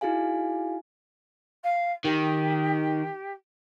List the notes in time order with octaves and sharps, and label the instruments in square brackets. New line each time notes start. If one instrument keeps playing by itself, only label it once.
[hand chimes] D#4 E4 F#4 G#4 F5 G#5
[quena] F5
[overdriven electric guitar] D#3 [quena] G4